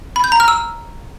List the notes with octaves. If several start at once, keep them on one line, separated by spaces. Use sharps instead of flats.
B5
G6
A#5
F6
E6